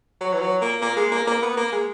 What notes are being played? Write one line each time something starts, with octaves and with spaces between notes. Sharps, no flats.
F#3
E3
F#3
A#3
A#3
G#3
A#3
A#3
B3
A#3
G#3